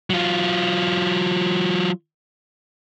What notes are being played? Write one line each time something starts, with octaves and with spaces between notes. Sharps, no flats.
F#3 F4